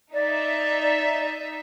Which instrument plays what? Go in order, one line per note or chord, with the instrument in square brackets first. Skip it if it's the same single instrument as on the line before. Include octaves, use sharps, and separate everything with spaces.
[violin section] D#4 E5 [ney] D5